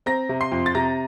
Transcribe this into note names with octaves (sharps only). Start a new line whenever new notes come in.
C4 A#5 A#6
C3
C6 C7
F2
A6
C3 A#5 A#6